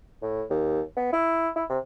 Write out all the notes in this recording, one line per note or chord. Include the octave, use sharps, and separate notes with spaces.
A2
D#2
B3
E4
E4
C3